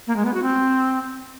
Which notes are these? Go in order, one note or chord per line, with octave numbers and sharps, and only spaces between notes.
A#3
G#3
B3
F#4
C4